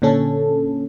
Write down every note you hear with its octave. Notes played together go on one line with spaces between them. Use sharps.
A#2 D3 C#4 A4